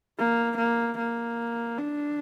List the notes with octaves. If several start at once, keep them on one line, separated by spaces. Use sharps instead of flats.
A#3
A#3
A#3
D4